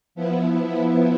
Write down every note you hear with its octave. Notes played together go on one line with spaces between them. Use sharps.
F3 B3 E4